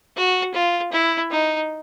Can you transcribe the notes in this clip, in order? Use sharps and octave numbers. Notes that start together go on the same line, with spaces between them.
F#4
F4
E4
D#4